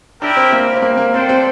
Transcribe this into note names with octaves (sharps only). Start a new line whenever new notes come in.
D4 E4 G4 A#4 E5 G5
C4
A#3
C4
A#3
A#3
C4 D4 A4 C5 G5
C4